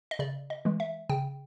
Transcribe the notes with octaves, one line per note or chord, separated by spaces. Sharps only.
D#5
C#3 D5
D#5
E3 G#3
E5
C#3 G5